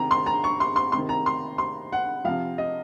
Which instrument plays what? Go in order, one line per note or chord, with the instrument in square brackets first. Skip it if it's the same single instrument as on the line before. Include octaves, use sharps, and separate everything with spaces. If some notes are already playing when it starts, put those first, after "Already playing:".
Already playing: [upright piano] C3 D#3 A#5
C6
A#5
C#6
C6
C6
C3 D#3 C6
A#5
C6
C6
F#5
C3 F3 F5
D#5